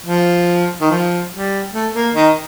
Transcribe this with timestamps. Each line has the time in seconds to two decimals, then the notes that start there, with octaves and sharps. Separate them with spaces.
0.06 F3
0.81 D#3
0.90 F3
1.32 G3
1.73 A3
1.94 A#3
2.15 D#3 D#4